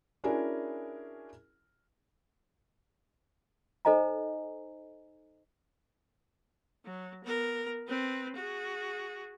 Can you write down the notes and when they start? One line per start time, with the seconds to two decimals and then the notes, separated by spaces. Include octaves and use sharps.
0.24 C#4 D4 E4 F#4 G#4 A#4
3.85 D#4 A4 C5 D#5 G#5 A#5
6.85 F#3
7.25 B3 A#4
7.88 C4 B4
8.36 F#4 G#4